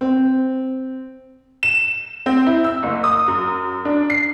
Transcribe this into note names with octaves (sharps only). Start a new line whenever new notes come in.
C4
E7
C4
E4
E6
F#1
D#6
F#2
D4
C7